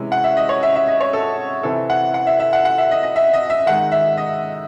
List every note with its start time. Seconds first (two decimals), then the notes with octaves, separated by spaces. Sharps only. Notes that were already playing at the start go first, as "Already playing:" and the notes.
Already playing: C3 E3 G#3 C#4 E4
0.12 F#5
0.24 E5
0.37 D#5
0.49 C#5
0.63 E5
0.76 E5
0.88 D#5
1.01 C#5
1.13 A4
1.63 C3 E3 C4 E4 A4
1.90 F#5
2.14 F#5
2.27 E5
2.40 E5
2.53 F#5
2.65 F#5
2.78 E5
2.91 D#5
3.03 D#5
3.16 E5
3.33 D#5
3.50 E5
3.66 D#3 G#3 D#4 F#5
3.92 E5
4.17 D#5